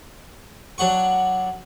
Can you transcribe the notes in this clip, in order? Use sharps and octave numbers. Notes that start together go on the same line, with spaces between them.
F#3 D4 F#5 C#6